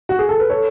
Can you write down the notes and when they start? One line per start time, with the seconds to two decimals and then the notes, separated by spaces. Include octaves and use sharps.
0.09 F#4
0.19 G#4
0.29 A4
0.39 B4
0.50 A4 C#5